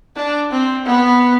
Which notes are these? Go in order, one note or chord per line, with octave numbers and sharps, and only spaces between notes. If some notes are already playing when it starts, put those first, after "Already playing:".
D4
C4
B3